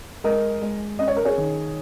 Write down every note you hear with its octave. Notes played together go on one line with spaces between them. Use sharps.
G#3 A#4 D#5
G#3
C#4 D#5
C#5
A#4
G#4 C#5
D#3